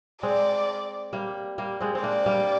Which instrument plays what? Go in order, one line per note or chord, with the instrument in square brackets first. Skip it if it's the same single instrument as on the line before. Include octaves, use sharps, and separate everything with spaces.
[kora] G#3 C4 [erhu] D5
[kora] G3 A#3
G3 A#3
G#3 C4
C4
[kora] A#3 D4 [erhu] D5
[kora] G3 A#3